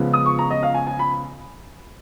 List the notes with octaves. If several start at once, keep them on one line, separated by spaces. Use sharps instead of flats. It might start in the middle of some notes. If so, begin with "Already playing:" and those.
Already playing: C#2 C#3 F3 G#3 B3
D#6
C#6
A#5
D#5
F5
G#5
G#5
B5